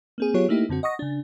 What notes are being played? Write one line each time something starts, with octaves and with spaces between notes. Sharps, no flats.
A#3 C4 G#4
F#3 B3 F4 G4 G#4 C#5
A3 A#3 D#4 E4 G4
F#2 D3 C4 F#4
D#5 F#5 C#6 D#6 A#6
C#3 D4